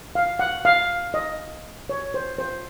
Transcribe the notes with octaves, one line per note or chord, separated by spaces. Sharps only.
F5
F#5
F5
D#5
C#5
C5
C5